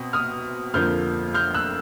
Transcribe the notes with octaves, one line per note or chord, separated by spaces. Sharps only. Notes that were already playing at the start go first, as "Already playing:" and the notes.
Already playing: B2 C4 D#6
D#6 F6
F2 D3 F3 A#3 F6 G6
F6 G6
E6 F#6